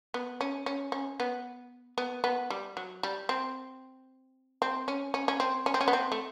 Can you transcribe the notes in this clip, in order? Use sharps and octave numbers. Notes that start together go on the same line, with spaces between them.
B3
C#4
C#4
C#4
B3
B3
B3
G3
F#3
G3
C4
C4
C#4
C#4
C#4
C4
C#4
C4
C#4
B3
C4
A3